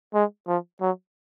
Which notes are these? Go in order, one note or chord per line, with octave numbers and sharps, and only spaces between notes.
G#3
F3
F#3